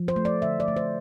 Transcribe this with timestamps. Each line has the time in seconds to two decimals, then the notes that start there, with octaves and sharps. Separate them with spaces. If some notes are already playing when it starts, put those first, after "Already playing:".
Already playing: F3
0.08 C5
0.16 A3
0.25 D5
0.42 D3 E5
0.60 D5
0.68 A3
0.77 C5